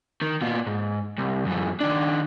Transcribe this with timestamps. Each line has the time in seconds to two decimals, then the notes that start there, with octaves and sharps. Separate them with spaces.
0.21 D#3
0.42 A#2 B3
0.66 G#2
1.18 C2
1.46 F#2 E3
1.80 D#3 D4